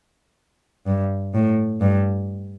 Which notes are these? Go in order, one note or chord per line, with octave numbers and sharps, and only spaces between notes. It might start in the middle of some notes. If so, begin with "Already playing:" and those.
G2
A2
G2